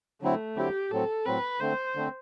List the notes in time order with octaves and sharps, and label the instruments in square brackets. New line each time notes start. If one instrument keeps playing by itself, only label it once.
[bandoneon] D3 F#3 C4 E4 [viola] A3
[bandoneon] D3 F#3 C4 E4 [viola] G4
[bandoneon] A2 F#3 C4 [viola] A4
[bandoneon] A2 F#3 C4 [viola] B4
[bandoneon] D3 A3 C4 [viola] C5
[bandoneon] D3 A3 C4